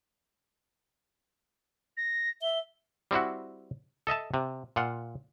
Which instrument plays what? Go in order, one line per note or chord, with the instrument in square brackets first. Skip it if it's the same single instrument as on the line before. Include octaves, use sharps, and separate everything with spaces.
[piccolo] A#6
[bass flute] E5 [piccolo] G7
[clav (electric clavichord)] G3 C4 E4 F#4
A4 D#5 E5 A5
C3
A#2 F4 F#5